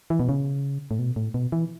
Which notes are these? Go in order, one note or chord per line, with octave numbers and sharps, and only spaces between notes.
E3
B2
C#3
A2
B2
A2
B2
E3